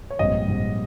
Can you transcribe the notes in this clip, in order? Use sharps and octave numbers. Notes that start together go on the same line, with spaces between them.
C#5
A#1 G#2 G3 C4 D#5
A#1 G#2 G3 C4